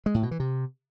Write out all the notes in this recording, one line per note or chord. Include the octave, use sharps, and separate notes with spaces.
G#3
A2
B2
E3
C3